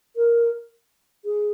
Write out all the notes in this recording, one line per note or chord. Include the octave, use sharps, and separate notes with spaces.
A#4
G#4